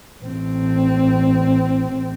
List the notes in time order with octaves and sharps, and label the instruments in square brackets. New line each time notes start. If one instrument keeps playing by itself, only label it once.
[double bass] A1 C4